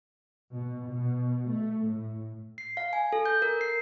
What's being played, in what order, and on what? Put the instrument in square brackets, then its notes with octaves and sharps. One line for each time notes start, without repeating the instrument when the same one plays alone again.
[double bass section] B2
B2
A3
A2
[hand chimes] C7
F5
G#5
A4
G6
A#4
C7